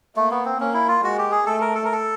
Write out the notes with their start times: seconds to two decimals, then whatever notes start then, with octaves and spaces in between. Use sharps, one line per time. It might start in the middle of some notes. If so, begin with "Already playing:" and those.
0.16 A3 A#3
0.31 B3
0.45 C4
0.60 A#3 C#4
0.74 E4
0.88 F4
1.04 G#3 F#4
1.18 G4
1.32 G#4
1.46 A3 A4
1.61 A#4
1.75 A4
1.85 A#4
1.92 A4